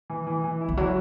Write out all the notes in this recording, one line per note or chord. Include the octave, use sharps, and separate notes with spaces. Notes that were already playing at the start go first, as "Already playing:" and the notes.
E3
E3
E3
E4
E3
F#3 E4